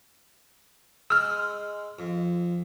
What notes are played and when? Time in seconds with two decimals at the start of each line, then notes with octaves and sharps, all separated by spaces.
1.10 G#3 E6 F6
1.99 F2